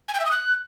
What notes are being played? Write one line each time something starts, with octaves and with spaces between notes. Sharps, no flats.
G#5
G5
E5
D#6
F#6